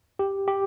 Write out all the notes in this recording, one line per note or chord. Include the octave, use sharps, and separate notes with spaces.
G4
G4